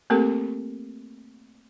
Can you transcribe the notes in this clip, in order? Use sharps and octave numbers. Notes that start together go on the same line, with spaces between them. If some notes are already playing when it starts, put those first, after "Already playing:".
A3 A#3 C4 G4 A4 A#4